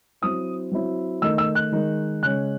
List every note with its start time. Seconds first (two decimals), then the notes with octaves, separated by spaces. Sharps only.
0.22 F#3 C4 E4 D#6
0.72 F#3 C4 E4
1.22 D#3 A3 D#4 E6
1.38 E6
1.55 F#6
1.72 D#3 G#3 D#4
2.23 C#3 G#3 C#4 F#6